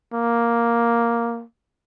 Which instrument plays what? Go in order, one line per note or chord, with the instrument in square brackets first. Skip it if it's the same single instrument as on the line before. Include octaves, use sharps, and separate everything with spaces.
[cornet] A#3